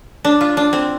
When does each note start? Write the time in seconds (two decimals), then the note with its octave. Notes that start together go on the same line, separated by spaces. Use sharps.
0.25 D4
0.41 F4
0.57 D4
0.73 C4